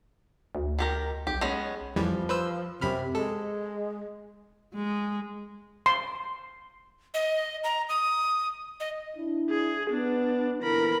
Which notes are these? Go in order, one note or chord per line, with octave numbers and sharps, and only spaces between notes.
D2
D#3 G4 A#4
B1 G4
G#3 B3 C#4
F2 E3 F3 G3
B4 C5 E6
F#2 C3 B5 F6
G#3 A4
G#3
C6
D#5
A#5
D#6
D#5
D4 E4
G#4
B3 D4
A#2 D3 E3 A#4 B5